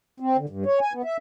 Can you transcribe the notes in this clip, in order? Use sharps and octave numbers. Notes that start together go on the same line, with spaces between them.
C4
D3
G2
C#5
G#5
B3
E5